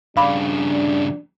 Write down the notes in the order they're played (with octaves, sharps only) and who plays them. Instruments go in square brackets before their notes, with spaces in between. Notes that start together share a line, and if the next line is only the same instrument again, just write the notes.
[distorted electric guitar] G2 C#3 [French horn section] D4 [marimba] F5 B5 D6